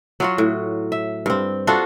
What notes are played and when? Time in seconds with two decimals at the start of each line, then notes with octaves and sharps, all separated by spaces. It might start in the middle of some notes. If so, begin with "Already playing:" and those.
0.20 F#3 F4 F#4
0.38 A2
0.92 E5
1.26 G2 C4
1.67 D4 F4 F#4 A4